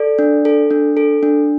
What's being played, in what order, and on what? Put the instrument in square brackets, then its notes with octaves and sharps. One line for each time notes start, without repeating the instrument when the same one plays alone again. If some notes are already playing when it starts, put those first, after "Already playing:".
Already playing: [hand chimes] A4 D5
D4
A4
D4
A4
D4